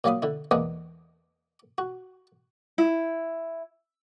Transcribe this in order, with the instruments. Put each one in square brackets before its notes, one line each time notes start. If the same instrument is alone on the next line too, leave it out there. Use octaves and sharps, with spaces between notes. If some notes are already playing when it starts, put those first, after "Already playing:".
[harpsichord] A#2 F#3 D5 F5 B5 D#6
D3 E4
E2 G#3 A#3 B3 D4 D#6
F#4
[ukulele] E4